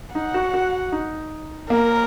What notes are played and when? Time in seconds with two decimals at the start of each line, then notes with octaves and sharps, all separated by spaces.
0.15 D#4 F#5
0.34 F#4
0.54 F#4
0.92 D#4
1.70 A#3 A#4